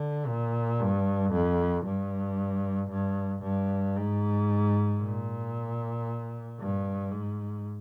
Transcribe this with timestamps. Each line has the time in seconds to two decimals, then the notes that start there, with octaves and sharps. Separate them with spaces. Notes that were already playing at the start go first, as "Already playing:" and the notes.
Already playing: D3
0.27 A#2
0.80 G2
1.32 F2
1.85 G2
2.90 G2
3.43 G2
3.96 G#2
5.01 A#2
6.59 G2
7.12 G#2